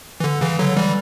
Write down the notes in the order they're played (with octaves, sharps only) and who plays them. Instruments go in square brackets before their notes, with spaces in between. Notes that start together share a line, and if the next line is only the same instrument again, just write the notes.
[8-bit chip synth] E3
D3
C#3 E3
D3 F#3
E3 G3